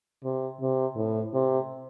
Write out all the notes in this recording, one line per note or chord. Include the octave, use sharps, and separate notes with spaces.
C3
C3
A2
C3